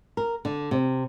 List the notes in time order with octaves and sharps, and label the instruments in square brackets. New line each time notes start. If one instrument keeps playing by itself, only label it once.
[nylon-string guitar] A#4
D3
C3